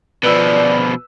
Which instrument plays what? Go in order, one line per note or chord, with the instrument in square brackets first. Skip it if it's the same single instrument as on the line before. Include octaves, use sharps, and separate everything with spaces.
[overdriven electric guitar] B2 F3 [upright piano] B4 E6 [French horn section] D5